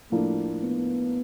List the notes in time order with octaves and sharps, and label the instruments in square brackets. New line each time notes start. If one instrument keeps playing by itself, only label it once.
[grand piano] A2 F3 A#3 D4 [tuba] A3
[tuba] B3